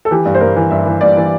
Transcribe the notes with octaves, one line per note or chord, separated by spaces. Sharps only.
A4
E3 G4
G2
C5
G2 A#4
E3
G2 E5
E3
G2 D5
E3